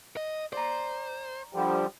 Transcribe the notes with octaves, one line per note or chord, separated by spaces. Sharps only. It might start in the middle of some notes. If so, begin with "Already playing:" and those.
D#5
C5 D5 A#5
D3 F3 G3 G4